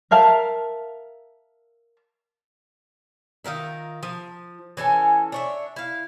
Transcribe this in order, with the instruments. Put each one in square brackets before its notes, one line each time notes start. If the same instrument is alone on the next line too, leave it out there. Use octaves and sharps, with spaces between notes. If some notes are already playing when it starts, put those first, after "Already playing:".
[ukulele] A#4 E5 F5 A5
[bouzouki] D#3 F4 A#4 E5
F3
E3 C#4 A4 G#5
D4 C#5 E5
E4 F5